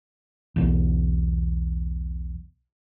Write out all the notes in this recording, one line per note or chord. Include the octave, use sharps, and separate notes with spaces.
B1 E2